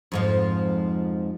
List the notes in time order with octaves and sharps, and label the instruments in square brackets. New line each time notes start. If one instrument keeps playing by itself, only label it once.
[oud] F2 G#2 F3